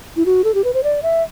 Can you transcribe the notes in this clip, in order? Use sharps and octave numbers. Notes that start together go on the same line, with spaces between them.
E4
F#4
A4
G4
B4
C5
D5
E5